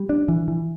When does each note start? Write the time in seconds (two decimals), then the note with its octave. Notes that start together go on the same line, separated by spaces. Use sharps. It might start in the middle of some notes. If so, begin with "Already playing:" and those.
Already playing: G3
0.09 D4
0.28 E3
0.48 E3